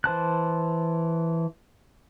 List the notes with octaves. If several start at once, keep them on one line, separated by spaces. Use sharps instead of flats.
E3 C5 A5 F#6